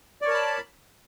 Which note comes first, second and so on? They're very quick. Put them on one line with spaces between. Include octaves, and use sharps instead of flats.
D5 C#5 A#4 A5 B5